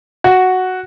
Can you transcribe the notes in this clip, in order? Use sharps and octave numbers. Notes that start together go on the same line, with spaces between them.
F#4